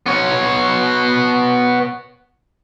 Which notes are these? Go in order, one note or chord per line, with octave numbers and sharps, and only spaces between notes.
B3 C#5